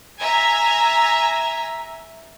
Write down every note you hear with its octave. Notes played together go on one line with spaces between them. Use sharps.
E5 G#5 A#5